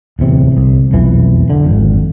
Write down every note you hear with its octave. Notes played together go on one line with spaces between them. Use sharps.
D1 E2 C3
C2
E1 B1 F2 E3
D3
G#1 F2